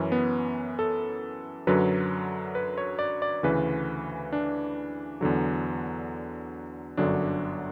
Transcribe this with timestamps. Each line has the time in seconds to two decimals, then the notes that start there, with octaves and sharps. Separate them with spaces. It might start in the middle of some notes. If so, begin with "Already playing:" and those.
Already playing: F#2 E3 C#4
0.12 B3
0.79 A4
1.67 F#2 D3 F#3 B4
2.55 B4
2.78 C#5
2.99 D5
3.22 D5
3.43 D2 C#3 E3 B4
4.33 D4
5.21 E2 D3 F#3
6.97 G1 F#2 D3 F#3 D4